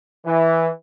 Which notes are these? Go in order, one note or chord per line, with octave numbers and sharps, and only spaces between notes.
E3